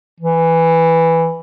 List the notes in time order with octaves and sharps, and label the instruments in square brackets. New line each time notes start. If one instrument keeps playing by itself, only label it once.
[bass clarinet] E3